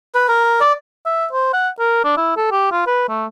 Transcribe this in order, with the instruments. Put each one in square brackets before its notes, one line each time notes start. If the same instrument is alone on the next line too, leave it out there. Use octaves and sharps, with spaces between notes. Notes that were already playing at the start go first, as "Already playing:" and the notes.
[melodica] B4
A#4
D5
[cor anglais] E5
C5
F#5
A#4
D4
E4
A4
G4
F4
B4
A3